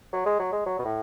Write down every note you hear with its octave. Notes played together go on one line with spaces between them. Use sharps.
F#3
G#3
F#3
G#3
F#3
B2
A2